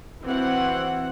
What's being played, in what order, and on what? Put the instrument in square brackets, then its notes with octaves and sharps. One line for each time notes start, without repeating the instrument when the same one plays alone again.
[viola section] E3 C4 F#4 C5 F#5